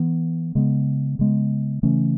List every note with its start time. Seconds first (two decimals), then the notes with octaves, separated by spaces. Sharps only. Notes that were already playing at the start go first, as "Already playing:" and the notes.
Already playing: E3 B3
0.55 C#3 G#3 B3
1.19 C#3 G#3 B3
1.83 C#3 E3 A3 C#4